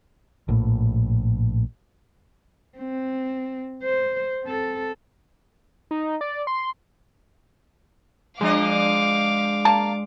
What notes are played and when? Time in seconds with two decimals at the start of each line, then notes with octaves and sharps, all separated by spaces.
0.49 A#1 A2
2.78 C4
3.83 C5
4.44 C4 A4
5.91 D#4
6.21 D5
6.47 C6
8.41 F3 G#3 D4 G#4 D#5 F5 D6
9.65 A#3 A5